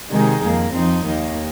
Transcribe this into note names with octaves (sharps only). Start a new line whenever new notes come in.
C3 D#3 G#3 D#4 G#4
F2 D#3 A#3
F2 F3 C4 D#4
D#2 D#3 A#3